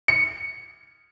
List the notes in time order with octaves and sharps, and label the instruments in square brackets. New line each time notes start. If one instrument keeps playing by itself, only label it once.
[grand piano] C#7